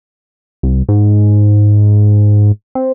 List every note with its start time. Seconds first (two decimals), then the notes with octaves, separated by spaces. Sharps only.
0.63 C2
0.89 G#2
2.75 C4